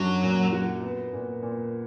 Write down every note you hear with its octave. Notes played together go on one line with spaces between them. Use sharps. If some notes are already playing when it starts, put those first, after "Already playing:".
Already playing: F#2 F#3 D4
A#2
F#4
B3
A#2
A#2